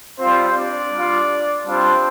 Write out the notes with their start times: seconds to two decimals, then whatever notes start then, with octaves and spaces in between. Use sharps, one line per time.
0.19 G3 C4 F4 C5
0.56 D4 D5
0.93 G3 F4
1.66 G3 C4 D4 F4 C5